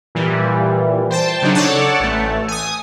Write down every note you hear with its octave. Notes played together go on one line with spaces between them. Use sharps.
A#2 E3 G3
C5 G5 A5
C#3 F#3 D4 D#4
A4 C#5 D5 F#5 A5
A1 A3
G#5 D#6